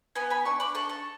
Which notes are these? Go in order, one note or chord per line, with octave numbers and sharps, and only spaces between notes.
B3 G#5 B5
G#5 B5
D4 A5 C#6
B5 D6
A4 A5 C#6
A5 C#6